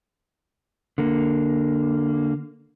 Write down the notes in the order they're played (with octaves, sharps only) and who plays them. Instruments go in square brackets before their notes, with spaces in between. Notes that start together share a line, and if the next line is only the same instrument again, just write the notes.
[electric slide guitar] D3 A#3